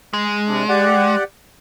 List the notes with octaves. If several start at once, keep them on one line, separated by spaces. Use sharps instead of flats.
G#3
C3 D4
G4 D5 F#5